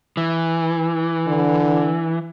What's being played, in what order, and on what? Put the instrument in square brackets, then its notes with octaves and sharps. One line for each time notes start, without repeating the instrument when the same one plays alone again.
[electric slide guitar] E3
[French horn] D3